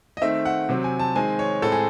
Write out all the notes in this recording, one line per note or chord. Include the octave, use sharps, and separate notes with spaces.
D#5
D#3 A3 C4 E5
F#5
C3 F#3 C4
G#5
A5
D#3 G#3 C4 G#5
C#5
A2 G#3 C4 A4
G#4